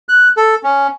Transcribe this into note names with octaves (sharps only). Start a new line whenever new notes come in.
F#6
A4
C#4